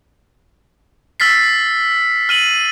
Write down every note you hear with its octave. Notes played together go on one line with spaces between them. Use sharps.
E6 F6 A6 B6 C7
F6 D#7 F#7